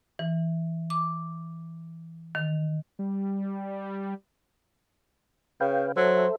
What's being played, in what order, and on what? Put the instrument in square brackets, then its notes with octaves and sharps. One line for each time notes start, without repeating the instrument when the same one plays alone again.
[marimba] E3
D6
D#3
[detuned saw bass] G3
[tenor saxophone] C#3 [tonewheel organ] B4 F5 G5
[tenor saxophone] F#3 [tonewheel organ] A4 E5 [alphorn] C5